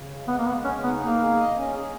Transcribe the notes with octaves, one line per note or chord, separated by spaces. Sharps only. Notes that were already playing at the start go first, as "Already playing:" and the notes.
Already playing: C#3
G#3
G#3 B3
A#3
G#3 B3
C#3 C#4
B3 D#4
A#3 G#4
G#4
D#5
C#4
G#4